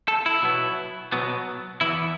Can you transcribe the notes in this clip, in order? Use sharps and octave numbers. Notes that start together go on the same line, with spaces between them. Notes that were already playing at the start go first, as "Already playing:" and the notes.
A4
E4
B2 F#3 B3
B2 F#3 B3
E2 E3 B3 E4